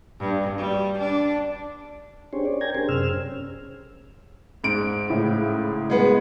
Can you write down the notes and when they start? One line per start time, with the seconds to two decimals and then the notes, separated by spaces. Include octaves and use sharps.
0.20 G2
0.57 G3
0.99 D4
2.33 C#4 D4 G4 G#4 C5 C#5
2.45 C#5 D5
2.61 A#4 C#5 G5 G#5 A#5 G#6
2.75 C#4 D4 G4 G#4 A#4 C5
2.89 F#2 C3 G#4 C5 E6 F6
3.09 C#4
4.64 G#2 D7
5.09 A2 C#3 E4
5.90 G#3 B3